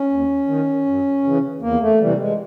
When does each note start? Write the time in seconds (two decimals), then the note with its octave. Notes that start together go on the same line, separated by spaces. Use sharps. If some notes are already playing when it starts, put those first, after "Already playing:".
Already playing: C#4
0.10 D#2
0.48 D#3
0.86 F#2
1.24 C#3 E3
1.61 E2 A#3
1.82 A3
2.00 C3 E3 G3
2.19 G#3